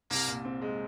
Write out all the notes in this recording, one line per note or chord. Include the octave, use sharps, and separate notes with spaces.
C2 A#3
A#2
C4
G#3